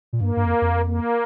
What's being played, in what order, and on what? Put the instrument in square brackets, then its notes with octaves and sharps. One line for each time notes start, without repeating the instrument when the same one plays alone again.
[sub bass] A#2
[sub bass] G2 [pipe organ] A#3
[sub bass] G2
F2
F2
[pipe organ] A#3